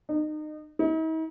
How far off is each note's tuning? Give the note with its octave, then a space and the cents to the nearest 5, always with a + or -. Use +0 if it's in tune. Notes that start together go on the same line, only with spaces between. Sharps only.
D#4 -30
D#4 +45